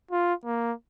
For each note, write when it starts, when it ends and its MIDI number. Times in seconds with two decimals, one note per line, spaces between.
0.11 0.33 65
0.45 0.73 58